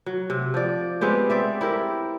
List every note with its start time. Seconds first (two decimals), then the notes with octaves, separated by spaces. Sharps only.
0.06 F#3
0.30 C3
0.54 F3 D5
1.01 G#3 B3 C4 G4
1.30 C4 D5 E5
1.61 E4 G4 A#4